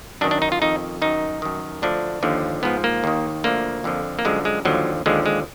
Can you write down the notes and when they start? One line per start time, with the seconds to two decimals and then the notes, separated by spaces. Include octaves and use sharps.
0.21 F#2 D4
0.24 D#3
0.31 D4
0.42 D#4
0.52 F4
0.62 F2 D#3 D#4
1.02 F#2 D#3 D#4
1.42 F#2 D#3
1.82 D2 D3 F3 D4
2.23 D#2 D3 F3
2.63 G#2 F3 B3
2.84 A#3
3.04 D#2 D#3
3.44 D2 D3 F3 A#3
3.84 F2 D3 F3
4.19 A#3
4.25 F#2 D3 F3 G#3
4.45 G#3
4.65 D#2 D3 F3 F#3
5.06 D#2 D3 F3 G#3
5.26 G#3